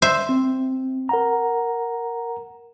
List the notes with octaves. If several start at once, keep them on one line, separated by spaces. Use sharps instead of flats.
C5 E5
C4
A#4 F#5 A#5